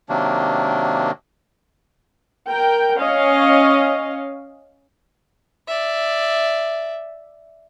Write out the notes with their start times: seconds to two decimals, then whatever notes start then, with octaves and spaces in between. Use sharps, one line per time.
0.09 C3 D#3 F#3 A#3 D4
2.49 A#4 G5
3.00 C#4 C#5 D#5 F5
5.67 D5 E5